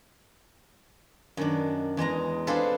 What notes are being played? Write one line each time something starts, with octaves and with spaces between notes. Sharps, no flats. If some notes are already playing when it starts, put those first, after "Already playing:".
F#2 D#3 D4
E2 G#3 D#5 A#5
C4 D4 F4 G#4 A4 B4